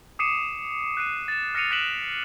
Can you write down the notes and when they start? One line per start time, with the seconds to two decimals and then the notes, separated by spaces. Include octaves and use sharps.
0.19 D6 D#6 C7 C#7 D#7 E7
0.97 F#6 C7 D#7
1.28 A6 E7
1.55 F6 A#6 C7 C#7 D#7 F7
1.71 F#6 A6 B6 D7 E7 F#7